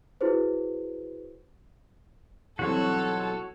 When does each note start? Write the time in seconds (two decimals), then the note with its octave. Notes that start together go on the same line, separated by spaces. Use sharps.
0.21 E4 F#4 G#4 B4 C5
2.59 B2 E3 F#3 G3 C4 F#4 A4 C#5